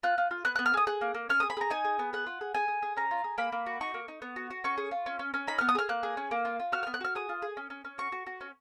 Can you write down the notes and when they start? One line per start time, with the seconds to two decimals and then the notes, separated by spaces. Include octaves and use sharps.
0.03 F4 F#6
0.18 F4
0.31 F4
0.45 B3 F#6
0.56 B3 F#6
0.66 F6
0.74 G#4 D#6
0.87 G#4 F#6
1.01 A#3
1.14 A#3
1.29 C#4 F6
1.40 G#4 D#6
1.50 B5
1.57 G#4 A#5
1.70 D#4 G#5
1.84 G#4
1.99 B3
2.13 G#4 F#5
2.27 F4
2.41 G#4
2.54 G#4 G#5
2.68 G#4
2.82 G#4
2.97 C#4 A#5
3.11 F4
3.24 G#4
3.38 A#3 B5
3.52 A#3
3.66 F#4
3.81 D#4 C#6
3.94 A#3
4.08 D#4
4.22 B3
4.36 F#4
4.50 F#4
4.64 C#4 C#6
4.78 G#4
4.91 F4
5.06 C#4
5.19 C#4
5.34 C#4
5.47 D#4 B5
5.58 B3 F6
5.69 D#6
5.75 G#4 F6
5.89 A#3 F#6
6.03 G#4
6.17 C#4
6.31 A#3
6.45 F4
6.60 F4
6.72 F#4 F6
6.83 B3 F6
6.94 F#6
7.01 F#4 F6
7.15 G#4 D#6
7.29 F4
7.42 G#4
7.57 C#4
7.70 C#4
7.85 C#4
7.98 F#4 C#6
8.12 F#4
8.27 F#4
8.41 C#4